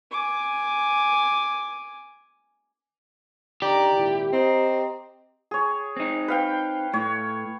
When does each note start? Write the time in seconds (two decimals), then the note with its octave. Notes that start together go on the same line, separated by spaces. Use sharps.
0.11 G#5 D6
3.62 D3 D#3 G4 D5 A#5
3.95 G#1 A#2 E4
4.33 C4 D#5 A#5
5.51 G#4 C#5
5.96 C4 D#4
6.28 B4 F5 G5
6.93 A2 C#5